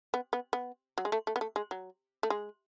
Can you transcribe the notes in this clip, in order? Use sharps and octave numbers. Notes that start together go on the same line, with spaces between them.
B3
B3
B3
F#3
G#3
A3
A3
B3
A3
G#3
F#3
A3
G#3